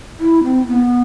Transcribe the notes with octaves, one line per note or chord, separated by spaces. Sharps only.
E4
C4
B3